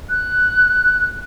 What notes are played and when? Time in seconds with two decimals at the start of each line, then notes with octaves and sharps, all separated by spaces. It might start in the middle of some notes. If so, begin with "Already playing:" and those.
0.10 F#6